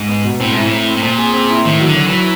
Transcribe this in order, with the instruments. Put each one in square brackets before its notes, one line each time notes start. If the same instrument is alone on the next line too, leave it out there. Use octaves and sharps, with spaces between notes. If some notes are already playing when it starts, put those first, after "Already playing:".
Already playing: [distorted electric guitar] G#2
[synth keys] B3
B2
[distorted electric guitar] A2 [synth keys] C4
[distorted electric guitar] G#2 [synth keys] E4
[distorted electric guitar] A2
[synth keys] C4
C4
[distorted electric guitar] A2
[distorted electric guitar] A#2 [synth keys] C4
[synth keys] G#4
C4
E4
[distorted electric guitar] A2 [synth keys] D#3
[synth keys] F#3
[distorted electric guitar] D3
[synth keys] F#3
[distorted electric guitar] E3 [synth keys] F#3